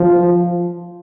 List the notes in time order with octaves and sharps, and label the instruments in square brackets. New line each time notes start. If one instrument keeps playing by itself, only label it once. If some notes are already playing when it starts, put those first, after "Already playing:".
Already playing: [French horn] F3